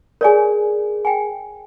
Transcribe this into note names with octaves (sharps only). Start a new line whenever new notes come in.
G#4 A#4 C#5 D5 G#5
G5 G#5